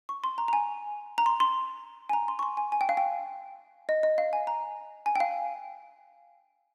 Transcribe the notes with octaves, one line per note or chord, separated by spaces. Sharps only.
C#6
C6
A#5
A#5
G#5
A#5
C6
C6
G#5
A#5
C6
C#6
C6
G#5
G#5
G5
F5
G5
D#5
D#5
F5
G#5
A#5
G#5
G5
F5